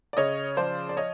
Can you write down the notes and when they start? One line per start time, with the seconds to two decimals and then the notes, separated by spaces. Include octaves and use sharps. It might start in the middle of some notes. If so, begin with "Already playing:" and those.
0.13 D5
0.17 C#3 C#5 D#5
0.57 F3 C5 D5
0.89 D5
0.97 C#5 D#5